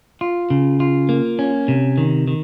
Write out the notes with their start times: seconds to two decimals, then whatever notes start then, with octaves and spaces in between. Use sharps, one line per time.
0.21 F4
0.50 C#3
0.80 F4
1.09 A#3
1.39 C#4
1.68 C3
1.98 D#3
2.28 D#3